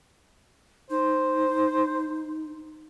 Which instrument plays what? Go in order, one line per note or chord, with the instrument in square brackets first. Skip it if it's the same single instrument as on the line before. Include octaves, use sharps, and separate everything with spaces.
[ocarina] D#4 [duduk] C5